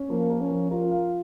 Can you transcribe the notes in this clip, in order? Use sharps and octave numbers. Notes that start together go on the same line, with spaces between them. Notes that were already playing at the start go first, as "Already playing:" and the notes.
Already playing: C#4
F3 A#3
A#4
C#4
F3
F4 A#4
F5